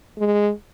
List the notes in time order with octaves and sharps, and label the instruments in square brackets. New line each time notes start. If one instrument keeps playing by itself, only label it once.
[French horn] G#3